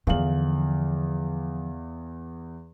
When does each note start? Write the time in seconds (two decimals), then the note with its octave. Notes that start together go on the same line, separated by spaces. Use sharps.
0.07 E2 D3 F3 F5 F#7